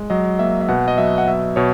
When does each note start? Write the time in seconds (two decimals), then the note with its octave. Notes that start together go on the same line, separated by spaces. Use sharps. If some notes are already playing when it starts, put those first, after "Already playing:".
Already playing: G#3
0.10 F#3 D#5
0.39 A#3 E5
0.61 E5
0.69 B2 F#5
0.88 D#5
0.98 F#3 E5
1.18 F#5
1.27 B2 E5
1.56 B2 C#5